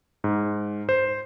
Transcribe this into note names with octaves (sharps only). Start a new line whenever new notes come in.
G#2
C5